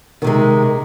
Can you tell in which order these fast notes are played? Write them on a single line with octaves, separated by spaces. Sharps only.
D#3 C3 G#3